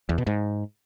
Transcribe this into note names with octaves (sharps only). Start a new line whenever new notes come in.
E2
B2
G#2